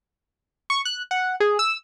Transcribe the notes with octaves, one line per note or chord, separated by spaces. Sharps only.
C#6
F#6
F#5
G#4
E6